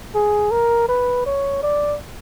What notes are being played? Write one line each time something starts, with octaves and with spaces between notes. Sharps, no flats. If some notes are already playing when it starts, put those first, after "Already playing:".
G#4
A#4
B4
C#5
D5